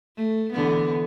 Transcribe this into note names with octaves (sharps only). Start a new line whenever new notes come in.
A3
D3 E3 B3